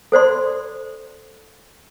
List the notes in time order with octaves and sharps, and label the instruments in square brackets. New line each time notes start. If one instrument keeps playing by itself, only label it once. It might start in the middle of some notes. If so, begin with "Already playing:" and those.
[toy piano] A4 C5 D5 C6